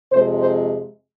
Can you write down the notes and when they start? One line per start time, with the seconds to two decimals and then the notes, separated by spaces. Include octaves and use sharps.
0.11 F2 C3 G#3 C5
0.40 C5